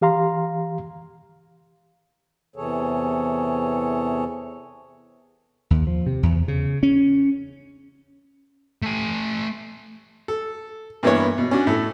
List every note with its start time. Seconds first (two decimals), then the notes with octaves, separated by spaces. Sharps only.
0.01 E3 G4 F5 A#5 C6
2.56 E2 C3 E3 G#4 A4 C#5
5.71 D#2
5.87 F3
6.06 C3
6.23 E2
6.48 C#3
6.83 C#4
8.82 A3 G#5
10.28 A4
11.03 G2 E3 A#3 B3 E4 C#5
11.38 B2
11.51 C#4 D4 F#4
11.67 A2 A4